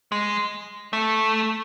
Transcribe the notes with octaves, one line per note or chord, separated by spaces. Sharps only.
G#3
A3